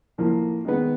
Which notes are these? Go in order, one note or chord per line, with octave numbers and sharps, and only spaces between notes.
A2 F3 A#3
D#3 G#3 B3